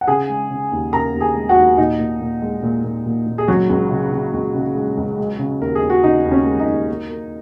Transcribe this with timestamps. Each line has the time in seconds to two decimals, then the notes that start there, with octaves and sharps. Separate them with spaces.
0.01 F#5
0.07 C#3 G#4 G#5
0.29 G#3
0.50 C#3
0.72 D#2
0.92 C#3 A#4 A#5
1.14 D#2
1.21 G#4 G#5
1.35 G#3
1.49 F#4 F#5
1.56 D#2
1.77 A#2 D#4
2.00 A#2
2.21 A#2
2.42 G#3
2.63 A#2
2.84 A#2
3.06 A#2
3.26 A#2
3.38 G#4
3.48 C#2 F#3 F#4
3.69 C#2
3.91 C#3
4.12 C#3
4.33 C#2
4.54 C#3
4.75 G#3
4.97 C#2
5.18 G#3
5.39 C#3
5.61 D#2 A#4
5.75 G#4
5.82 D#2
5.90 F#4
6.03 C#3 D#4
6.25 D#2
6.31 C#4
6.46 G#3
6.60 D#4
6.67 D#2
6.88 A#3
7.10 A#3